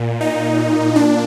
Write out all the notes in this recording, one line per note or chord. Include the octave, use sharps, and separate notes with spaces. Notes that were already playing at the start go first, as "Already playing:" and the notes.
Already playing: A#2
D#4
D4